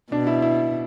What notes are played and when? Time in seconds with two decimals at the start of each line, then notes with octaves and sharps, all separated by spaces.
0.11 B2 D4
0.27 E4
0.42 E4